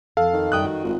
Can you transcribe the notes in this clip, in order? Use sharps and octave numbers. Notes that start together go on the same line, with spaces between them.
F2 A4 F5
D#3
F#2 G3 G5 D#6 F#6
F#4
G#1 F4